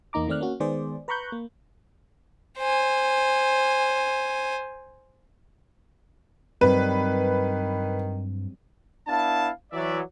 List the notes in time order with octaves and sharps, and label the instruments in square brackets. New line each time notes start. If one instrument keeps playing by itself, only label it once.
[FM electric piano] E2 A#3 D#4 A#5 D6
D#3 A3 C4 D5 F6 F#6
A#3 C#4 F#4
D#3 G#3 B3 G#4 C5 D5
B4 A#5 B5 C#6 F#6 G6
A#3
[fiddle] C5 G#5
[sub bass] G2 [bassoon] D#3 [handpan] F#3 G3 C4 [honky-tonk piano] B4
[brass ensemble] B3 D4 E4 F5 A5
E3 F#3 D5 E5